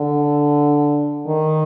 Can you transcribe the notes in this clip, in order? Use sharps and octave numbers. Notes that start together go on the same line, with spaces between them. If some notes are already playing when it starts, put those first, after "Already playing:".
Already playing: D3
D#3